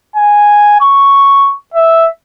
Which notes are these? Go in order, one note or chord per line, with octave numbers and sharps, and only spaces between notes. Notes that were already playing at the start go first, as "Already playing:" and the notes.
G#5
C#6
E5